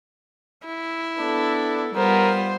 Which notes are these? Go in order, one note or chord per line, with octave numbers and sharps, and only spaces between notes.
E4
B3 D4 A4
G3 B3 F4 A#4 C5